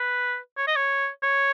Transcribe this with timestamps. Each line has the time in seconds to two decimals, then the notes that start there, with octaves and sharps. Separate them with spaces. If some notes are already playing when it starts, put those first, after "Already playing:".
Already playing: B4
0.57 C#5
0.67 D#5
0.76 C#5
1.23 C#5